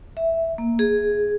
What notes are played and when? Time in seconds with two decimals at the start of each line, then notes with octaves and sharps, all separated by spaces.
0.17 E5
0.58 A#3
0.79 G#4